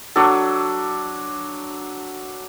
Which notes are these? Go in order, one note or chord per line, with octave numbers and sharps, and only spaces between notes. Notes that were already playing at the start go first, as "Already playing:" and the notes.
F#3 D4 A4